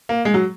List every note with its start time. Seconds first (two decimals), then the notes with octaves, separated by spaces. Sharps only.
0.09 A#3
0.25 G#3
0.34 F#3